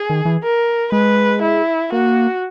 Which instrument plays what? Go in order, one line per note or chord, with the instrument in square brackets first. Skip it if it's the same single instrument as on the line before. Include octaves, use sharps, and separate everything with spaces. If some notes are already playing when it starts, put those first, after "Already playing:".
Already playing: [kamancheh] G#4
[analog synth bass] D#3
E3
[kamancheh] A#4
[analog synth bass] G#3 [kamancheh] B4
[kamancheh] E4
[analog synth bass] A#3 [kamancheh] F#4